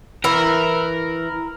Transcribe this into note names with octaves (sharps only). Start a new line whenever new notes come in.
E3 E4 A#4